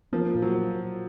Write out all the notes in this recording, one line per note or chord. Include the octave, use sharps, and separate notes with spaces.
F3 A#3
A#2
F#3